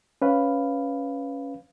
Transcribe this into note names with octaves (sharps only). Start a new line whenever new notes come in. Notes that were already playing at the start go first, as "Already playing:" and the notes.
C#4 B4 F5